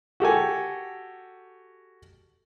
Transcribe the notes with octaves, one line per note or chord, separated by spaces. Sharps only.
F#4 G4 A4 G#5